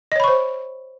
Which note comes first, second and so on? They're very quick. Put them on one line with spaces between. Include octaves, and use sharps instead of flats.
D#5 C#5 B5 C#6 C5